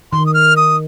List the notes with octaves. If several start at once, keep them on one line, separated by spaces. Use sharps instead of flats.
D#3 C6
D#6
F6
D#6